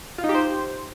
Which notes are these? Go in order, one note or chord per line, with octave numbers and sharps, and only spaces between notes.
F4
D#4
G4
C5